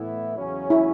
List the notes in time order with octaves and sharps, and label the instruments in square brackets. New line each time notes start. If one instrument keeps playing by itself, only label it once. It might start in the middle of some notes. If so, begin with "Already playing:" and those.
Already playing: [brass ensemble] A2 E3 B3 E4
E2 C#3 F#3 C#4
[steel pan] E4